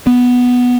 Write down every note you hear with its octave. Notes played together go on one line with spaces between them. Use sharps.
B3